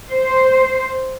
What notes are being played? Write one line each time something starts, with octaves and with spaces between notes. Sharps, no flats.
C5